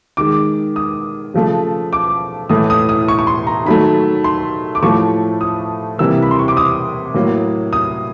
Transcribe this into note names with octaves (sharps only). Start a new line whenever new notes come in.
D#3 G#3 D6
D#6
C#3 F3 A3
D6
A2 E3 A3 D#6
D#6
D#6
C#6
C#6
C6
A#5
D#3 F#3 A3 B5
C6
D6
A2 F3 A3 C#6
D#6
C3 E3 G3 A#3 E6
B5
C6
C#6
D6
D#6
A2 F#3 A#3
D#6